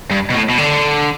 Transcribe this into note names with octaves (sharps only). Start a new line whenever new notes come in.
G2
B2
A2
B2
D3